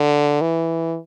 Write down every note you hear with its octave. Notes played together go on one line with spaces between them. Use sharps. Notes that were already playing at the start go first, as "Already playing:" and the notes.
Already playing: D3
E3